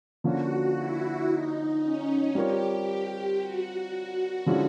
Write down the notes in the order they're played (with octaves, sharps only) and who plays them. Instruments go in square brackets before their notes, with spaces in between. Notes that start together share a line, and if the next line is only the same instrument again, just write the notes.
[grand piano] D3 F3 A#3 C#4 [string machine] F#4
[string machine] E4
D#4
C#4
[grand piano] G3 C4 F4 A#4 C#5 [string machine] G4
[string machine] G4
F#4
[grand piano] D3 F3 G#3 C#4 E4